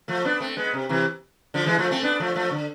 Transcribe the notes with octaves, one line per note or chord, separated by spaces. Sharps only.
F3 A3
B3 D4
A3 C4
G#3 B3
C3
C3 E3
D3 F3
E3 G#3
F3 A3
A3 C4
B3 D4
F3 A3
F3 A3
D3